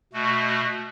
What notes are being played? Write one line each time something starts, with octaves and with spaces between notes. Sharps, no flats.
B2 A3 F#4